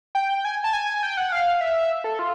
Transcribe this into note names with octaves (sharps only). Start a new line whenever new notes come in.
G5
G#5
A5
G#5
G5
F#5
F5
E5
A4
F4